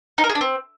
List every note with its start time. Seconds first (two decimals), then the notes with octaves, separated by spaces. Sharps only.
0.18 D#4
0.24 A#4
0.29 G#4
0.35 D4
0.41 C4